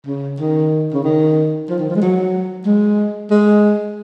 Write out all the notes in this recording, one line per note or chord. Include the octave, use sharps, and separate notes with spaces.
C#3
D#3
C#3
D#3
F3
D#3
F3
G#3
F#3
G#3
G#3